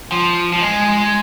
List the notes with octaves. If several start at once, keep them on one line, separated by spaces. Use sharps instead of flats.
F3
F3
G#3